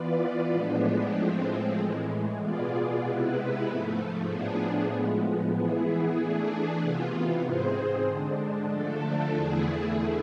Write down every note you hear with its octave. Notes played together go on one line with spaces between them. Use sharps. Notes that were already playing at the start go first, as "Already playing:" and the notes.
Already playing: E3 B3 F4 B4 D5
A2 F3 G#3 B3 D4
A2 F3 G#3 C4
A2 E3 G#3
B2 B3 F4 G#4 D5
C3 G#3 B3 E4 B4
G#2 F3 A3
A2 F3 B3 D4 G#4
A2 F3 G#3 B3
E3 B3 E4 G#4
E3 A3 D4 G#4
C3 E3 B3 F4
G#2 G#3 C4 G#4 C5
D3 G#3 D4
D3 F3 A3 D4 A4
E2 D3 A3 E4 G#4